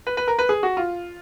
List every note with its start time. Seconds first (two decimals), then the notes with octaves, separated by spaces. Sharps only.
0.07 B4
0.17 B4
0.28 A#4
0.39 B4
0.49 G#4
0.63 F#4
0.77 F4